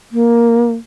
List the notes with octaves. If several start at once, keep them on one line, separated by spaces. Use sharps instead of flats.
A#3